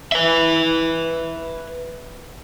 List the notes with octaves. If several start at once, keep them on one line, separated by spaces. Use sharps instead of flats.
B4 E5